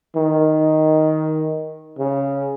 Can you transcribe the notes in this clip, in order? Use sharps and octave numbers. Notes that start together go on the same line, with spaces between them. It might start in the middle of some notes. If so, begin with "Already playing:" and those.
D#3
C#3